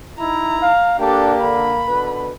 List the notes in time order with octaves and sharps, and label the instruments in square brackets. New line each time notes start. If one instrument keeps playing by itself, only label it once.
[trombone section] D#4 E4 [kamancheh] A#5
[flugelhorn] F5
[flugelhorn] A#3 [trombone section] D4 [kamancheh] G4 A4
[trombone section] D3 [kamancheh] B5
[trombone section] B2 D3 B4